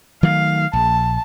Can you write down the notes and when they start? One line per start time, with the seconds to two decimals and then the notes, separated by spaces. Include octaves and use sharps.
0.23 D#3 F#3 A3 F5
0.73 A#1 A5